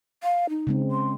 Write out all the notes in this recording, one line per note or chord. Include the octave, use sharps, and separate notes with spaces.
F5
D#4
C#3 G#3 C4
C6